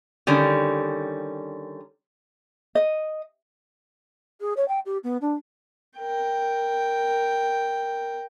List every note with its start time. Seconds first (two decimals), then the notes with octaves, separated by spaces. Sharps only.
0.27 D3 D#3 G3 C#4
2.75 D#5
4.41 G#4
4.57 C#5
4.68 G5
4.86 G4
5.04 B3
5.21 D4
5.99 A#4 G5